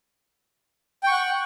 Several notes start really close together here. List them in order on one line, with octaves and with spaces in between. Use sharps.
G5 C#6 F#5